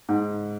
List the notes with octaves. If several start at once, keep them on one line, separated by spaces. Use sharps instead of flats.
G#2